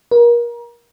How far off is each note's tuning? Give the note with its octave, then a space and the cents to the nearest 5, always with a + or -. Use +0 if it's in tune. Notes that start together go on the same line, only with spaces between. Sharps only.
A#4 +30